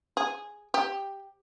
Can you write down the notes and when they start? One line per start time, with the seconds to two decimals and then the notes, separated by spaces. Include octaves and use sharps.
0.17 G#4
0.74 G4